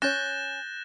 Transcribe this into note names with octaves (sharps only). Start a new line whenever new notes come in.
C#4 C#5 F#6 G6 A6 A#6 E7 G7